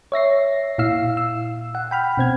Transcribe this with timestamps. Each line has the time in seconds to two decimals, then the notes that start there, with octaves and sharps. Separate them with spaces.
0.12 C#5 E5 A#6 C7
0.78 A#2 E4 F5 E6 C7
1.17 E6
1.75 F#5
1.91 G5 B5 F6
2.17 B2 C4 G#6